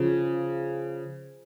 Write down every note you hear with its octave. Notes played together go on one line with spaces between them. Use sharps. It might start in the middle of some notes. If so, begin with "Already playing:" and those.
Already playing: C#3 F3